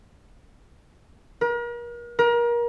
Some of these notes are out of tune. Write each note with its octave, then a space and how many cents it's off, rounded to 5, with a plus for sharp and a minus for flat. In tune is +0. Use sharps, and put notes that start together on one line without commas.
A#4 +40
A#4 +30